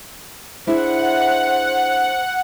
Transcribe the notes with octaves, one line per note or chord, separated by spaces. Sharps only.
D4 E4 G#4 C5 F#5